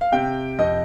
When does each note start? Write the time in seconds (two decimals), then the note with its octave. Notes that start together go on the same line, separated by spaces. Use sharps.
0.01 F5
0.12 C3 G5
0.59 F2 D#5